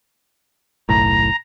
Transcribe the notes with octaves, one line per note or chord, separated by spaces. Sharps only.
F#1 B1 A2 A#5